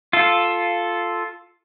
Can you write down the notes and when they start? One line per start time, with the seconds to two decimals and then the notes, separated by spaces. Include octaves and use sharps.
0.13 F4 A4